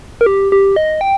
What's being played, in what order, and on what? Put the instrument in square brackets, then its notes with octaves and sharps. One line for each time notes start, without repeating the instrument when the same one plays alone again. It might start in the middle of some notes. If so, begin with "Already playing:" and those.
[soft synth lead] A#4
G4
G4
D#5
G5